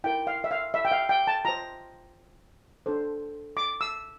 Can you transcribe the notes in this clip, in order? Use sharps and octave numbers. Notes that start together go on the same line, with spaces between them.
E4 A#4 G5
F5
E5
F5
E5
G5
F5
G5
A5
F4 C5 A#5
D4 A4 C5
D6
E6